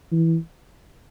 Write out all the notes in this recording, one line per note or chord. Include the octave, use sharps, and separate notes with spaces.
E3